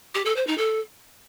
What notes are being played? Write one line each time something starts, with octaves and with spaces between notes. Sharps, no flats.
G4
A4
C5
D#4
A4